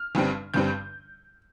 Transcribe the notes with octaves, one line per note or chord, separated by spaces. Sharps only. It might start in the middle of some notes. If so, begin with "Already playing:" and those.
Already playing: F6
G1 G2 G3 C4
G1 G2 G3 C4 G6